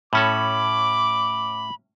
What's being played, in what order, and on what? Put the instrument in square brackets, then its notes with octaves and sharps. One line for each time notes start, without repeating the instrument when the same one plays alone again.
[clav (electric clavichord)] A2 C#4 A4 [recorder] B5 [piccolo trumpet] D6